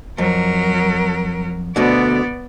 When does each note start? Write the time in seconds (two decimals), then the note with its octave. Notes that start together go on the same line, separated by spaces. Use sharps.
0.18 F2 F#3 A#4
1.76 D2 B2 D3 B3 D5